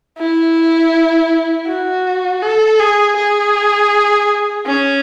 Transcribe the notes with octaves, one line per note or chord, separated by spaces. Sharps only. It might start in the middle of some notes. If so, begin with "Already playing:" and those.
E4
F#4
A4
G#4
G#4
C#4